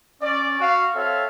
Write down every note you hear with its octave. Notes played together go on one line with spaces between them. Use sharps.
C#4 D5
F#4 F5
C4 A4 C#5 E5 F5